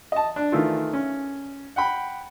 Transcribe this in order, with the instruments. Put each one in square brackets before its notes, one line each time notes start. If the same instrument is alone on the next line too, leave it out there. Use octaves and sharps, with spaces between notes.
[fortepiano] D#5 A5
D4
D#3 E3 A3 F4
C#4
F#5 G5 B5